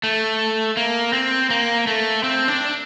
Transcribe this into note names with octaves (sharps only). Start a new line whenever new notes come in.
A3
A#3
C4
A#3
A3
C4
D4